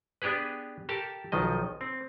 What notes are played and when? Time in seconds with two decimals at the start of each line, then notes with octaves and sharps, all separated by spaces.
0.22 B3 D4 G4 G#4 B4
0.89 G4 A4 A#4 A5
1.32 B1 D#3 F3 D#5
1.81 C4